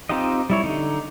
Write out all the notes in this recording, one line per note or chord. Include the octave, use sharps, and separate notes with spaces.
C4 D#4 F4 G4 D#5
G3 E4 C#5
D3 D#4